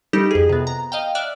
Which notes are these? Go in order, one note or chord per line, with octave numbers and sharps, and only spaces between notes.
G3 D#4 E4 G4 A4
F2 G#4
C3 B3
A#5
D#5 F5 G5
D5 E5 F6 F#6